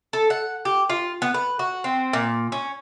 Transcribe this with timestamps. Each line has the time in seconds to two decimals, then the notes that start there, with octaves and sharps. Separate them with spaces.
0.13 A4
0.30 F#5
0.65 G4
0.90 F4
1.22 B3
1.34 B4
1.59 F#4
1.84 C4
2.13 A#2
2.52 C#4